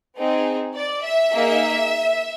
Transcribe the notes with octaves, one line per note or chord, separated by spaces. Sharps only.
C4 D#4 G#4
D5
E5
A#3 D#4 G#4